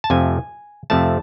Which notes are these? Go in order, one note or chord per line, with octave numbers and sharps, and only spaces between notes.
A5
F2 C3 F3 A3 G#5
F2 C3 F3 A3 A5